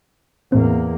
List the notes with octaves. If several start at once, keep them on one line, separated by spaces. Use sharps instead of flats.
E2 A2 A#3 C4